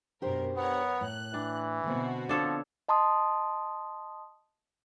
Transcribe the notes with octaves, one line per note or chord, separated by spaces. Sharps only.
F#2 B2 D4 G4 A#4 C5
B3 A#4 C#5 F#5
A2 F#6
E3 D4
B2 D3 C4 F#4
F3 D4 A4 C#5
D#5 A5 C6 D#6